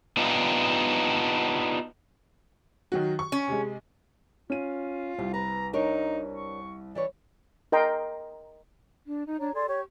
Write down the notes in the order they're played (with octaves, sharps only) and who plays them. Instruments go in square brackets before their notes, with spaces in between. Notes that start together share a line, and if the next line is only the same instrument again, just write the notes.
[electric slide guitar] B3 D4 D#4 F4 G4
[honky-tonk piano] D#3 F#3 F#4
C#6
[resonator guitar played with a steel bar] C#4
[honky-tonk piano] C3 G#3
[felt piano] C#4 D#7 [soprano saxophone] F4
[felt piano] C2 [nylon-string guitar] G4
[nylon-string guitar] B4 [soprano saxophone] A#5
[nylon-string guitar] D4 A#4 C#5 [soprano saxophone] D#4
[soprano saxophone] C#6
[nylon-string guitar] E3 B4 C#5 [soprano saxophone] D5
[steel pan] A#4 D#5 G5 A#5 C6
[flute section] D4
D#4
D4 C#5 A#5
G#4 A4 D5 C6
G4 C#5 C#6